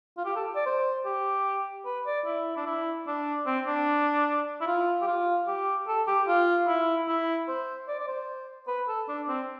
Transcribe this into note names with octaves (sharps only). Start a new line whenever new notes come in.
F4
G4
A4
D5
C5
G4
B4
D5
E4
D4
E4
D4
C4
D4
E4
F4
G4
F4
G4
A4
G4
F4
E4
E4
C5
D5
D5
C5
B4
A4
D4
C4